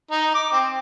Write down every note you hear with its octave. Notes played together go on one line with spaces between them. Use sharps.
D#4
D6
C4